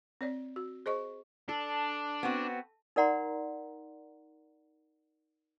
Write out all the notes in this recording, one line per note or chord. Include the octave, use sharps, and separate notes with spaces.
C4 C#5 D5
F#4
G#4 C5 D#5 C#6
D4 A4
B3 C4 F#4
D#4 A#4 D5 F#5 A#5 C6